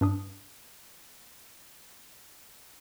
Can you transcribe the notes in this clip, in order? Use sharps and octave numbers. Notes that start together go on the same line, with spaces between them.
G2 D4 D#6